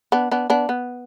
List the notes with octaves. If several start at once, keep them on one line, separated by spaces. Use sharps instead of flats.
B3 D4
B3 D4
B3 D4
B3